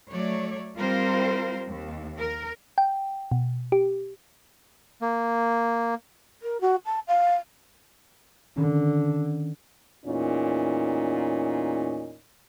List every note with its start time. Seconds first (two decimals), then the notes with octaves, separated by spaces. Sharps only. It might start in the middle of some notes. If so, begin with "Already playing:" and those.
0.11 F#3 A3 C#5 D5
0.77 G3 C4 F4 A#4 C5
1.67 D#2
2.18 A#4
2.78 G5
3.32 B2
3.72 G4
5.02 A#3
6.42 A#4
6.61 F#4
6.85 A5
7.07 F5
8.56 D3 D#3 C#4
10.06 E2 A#2 C#4 D#4